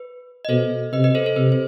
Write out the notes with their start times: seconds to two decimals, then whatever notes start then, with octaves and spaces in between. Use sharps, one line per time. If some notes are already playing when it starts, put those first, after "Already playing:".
Already playing: B4
0.45 D#5
0.49 B2 A4 C5
0.93 C3 B4 D#5
1.04 B4 D#5
1.15 A4 C5
1.26 A4 C5
1.36 C3 B4
1.52 C5